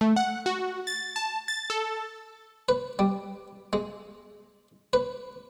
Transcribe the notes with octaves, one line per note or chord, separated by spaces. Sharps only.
A3
F#5
F#4
A6
A5
A6
A4
B4
G3
G#3
B4